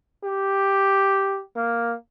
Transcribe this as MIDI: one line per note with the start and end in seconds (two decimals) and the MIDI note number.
0.24 1.41 67
1.56 1.94 58